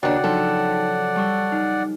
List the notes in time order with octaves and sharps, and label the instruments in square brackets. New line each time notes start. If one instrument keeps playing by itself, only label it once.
[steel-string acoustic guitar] D#2 D4 [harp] C#3 [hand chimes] F#4 C#5 G5 [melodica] D5 F#5
[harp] F3 F#3 [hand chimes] D#4 G5 [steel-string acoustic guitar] A4
[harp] G3 E6 [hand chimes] A5 C#6 D6
[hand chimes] D#4